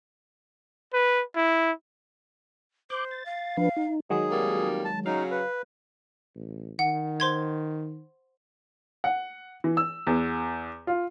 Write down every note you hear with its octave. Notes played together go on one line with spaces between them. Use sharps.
B4
E4
C5 D6 F#6 G6
A6
F5
F3 D4 B4
D#4
D#3 F#3 G#3 G#4
F2 G3 A#3
A5
C#3 F#3 D#4 F5
B4
A1
D#3 F#5
C5 C6 G#6
F#5
E3
E6
E2
F4